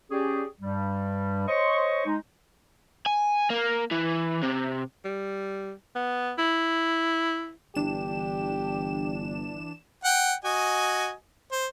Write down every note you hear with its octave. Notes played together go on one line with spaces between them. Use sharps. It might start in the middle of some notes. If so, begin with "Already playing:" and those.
C#4 G4 G#4 D5
G2 G3
C5 C#5 D#5 C#6
G#3 D#4
G#5
A#3
E3
C3
G3
B3
E4
G1 E3 D4 G4 E7
F#5 G5
F#4 D#5 G#5
C5